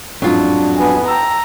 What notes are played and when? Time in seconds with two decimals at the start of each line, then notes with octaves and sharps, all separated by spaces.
0.22 A1 F2 G#2 F#3 D4 F4
0.77 B3 G#5
1.08 G5 A5 A#5 E6